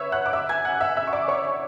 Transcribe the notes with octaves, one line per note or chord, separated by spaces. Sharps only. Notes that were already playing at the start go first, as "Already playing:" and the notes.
Already playing: B4 C#5 E5 C#6 E6
F#5 F#6
D6
E5 E6
G#5 G#6
F#5 F#6
E5 E6
E5 E6
C#6
D5 D6
C#5 C#6